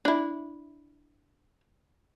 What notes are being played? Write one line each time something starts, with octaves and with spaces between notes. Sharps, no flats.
D4 E4